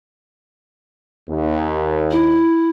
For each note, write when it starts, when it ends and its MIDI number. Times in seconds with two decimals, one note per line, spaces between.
1.28 2.43 39
2.11 2.69 64